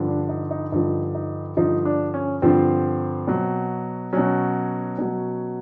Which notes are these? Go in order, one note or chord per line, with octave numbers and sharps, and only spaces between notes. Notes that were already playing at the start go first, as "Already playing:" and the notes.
Already playing: G2 D3 F3
D4
D#4
D#4
G2 D3 F3 D#4
D#4
G2 D3 F3 D#4
D4
C#4
G2 D3 F3 C4
B2 F#3
B2 F#3 C#4
B2 F#3